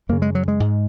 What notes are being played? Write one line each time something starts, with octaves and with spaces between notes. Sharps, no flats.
F#2 C#3 A#3
G#3
F#3
G#3
G#2